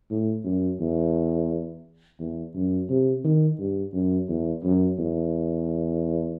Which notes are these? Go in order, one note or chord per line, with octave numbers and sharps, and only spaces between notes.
A2
F#2
E2
E2
F#2
C3
D#3
G2
F#2
E2
F#2
E2